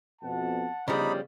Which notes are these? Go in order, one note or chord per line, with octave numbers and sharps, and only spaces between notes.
F2 B2 F#5 A5
G1 C#3 F3 G3 D#4 D#5 B5 D6